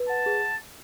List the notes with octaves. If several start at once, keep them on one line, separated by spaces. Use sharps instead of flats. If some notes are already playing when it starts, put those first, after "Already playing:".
Already playing: B4
F#5 A5
G#4